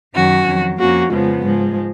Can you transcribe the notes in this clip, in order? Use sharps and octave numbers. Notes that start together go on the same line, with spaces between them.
F#2 D#3 F#3 C#4 F#4
F2 D#3 F#3
F2 F3 A#3 C#4 F#4
F2 C#3 F3 G#3 B3
G#2 F3 G#3